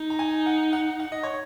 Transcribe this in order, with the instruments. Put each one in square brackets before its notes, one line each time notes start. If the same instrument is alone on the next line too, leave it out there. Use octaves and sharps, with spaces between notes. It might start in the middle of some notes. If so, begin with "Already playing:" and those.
Already playing: [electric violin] D#4
[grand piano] A#5
G#5
F#5
F#5
F#5
D#5
C#5